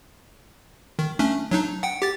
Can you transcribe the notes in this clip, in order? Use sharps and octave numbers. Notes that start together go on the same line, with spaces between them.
D#3
A3 C#4 D4
F#3 D4 D#4
F#5 G5
G4 A6